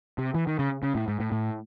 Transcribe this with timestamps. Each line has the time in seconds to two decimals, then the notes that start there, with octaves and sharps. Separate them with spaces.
0.18 C3
0.35 E3
0.47 D#3
0.59 C#3
0.83 C#3
0.95 A2
1.08 G#2
1.20 A2
1.32 A2